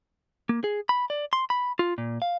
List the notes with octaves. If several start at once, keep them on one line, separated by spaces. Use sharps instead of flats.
A#3
G#4
B5
D5
C6
B5
F4
A#2
F5